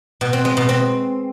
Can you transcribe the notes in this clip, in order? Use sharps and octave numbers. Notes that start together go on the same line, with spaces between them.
B2
C4
G#3
B2
C4